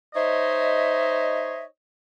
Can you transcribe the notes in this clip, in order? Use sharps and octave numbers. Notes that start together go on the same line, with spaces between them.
D#4 C5 C#5 D#5 E5